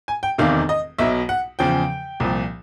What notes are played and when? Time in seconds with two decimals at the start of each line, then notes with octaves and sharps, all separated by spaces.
0.08 G#5
0.23 G5
0.38 F1 E2 C3 D#3 F5
0.69 D#5
0.98 B1 B2 E5
1.29 F#5
1.59 E2 C#3 F3 G5
2.20 C2 A#2 F3